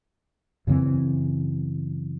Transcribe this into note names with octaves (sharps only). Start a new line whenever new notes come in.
F#2 C#3 E3 C4